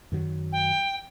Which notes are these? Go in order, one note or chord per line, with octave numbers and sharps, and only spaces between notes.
F#2 D#3 F#3
G5